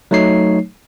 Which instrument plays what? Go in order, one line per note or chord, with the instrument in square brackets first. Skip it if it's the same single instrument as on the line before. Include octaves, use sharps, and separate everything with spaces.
[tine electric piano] F#3 A3 D#4 C#5 C7